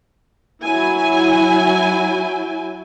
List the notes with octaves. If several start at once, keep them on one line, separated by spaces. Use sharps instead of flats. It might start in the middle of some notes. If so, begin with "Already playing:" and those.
F#3 E4 G#5